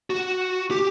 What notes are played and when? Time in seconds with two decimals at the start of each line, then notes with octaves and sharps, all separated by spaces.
0.10 F#4
0.71 G4